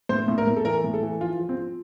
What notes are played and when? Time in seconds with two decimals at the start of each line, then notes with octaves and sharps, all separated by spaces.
0.09 A2 C5
0.28 A2
0.38 A#4
0.47 A2
0.57 A4
0.65 E3 A#4
0.84 A2
0.94 A4
1.02 E3
1.20 F3 F4
1.39 F3
1.49 C4
1.57 F3